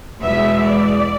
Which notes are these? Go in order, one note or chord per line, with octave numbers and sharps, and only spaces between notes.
E2 B2 G#3 B3 E5
D5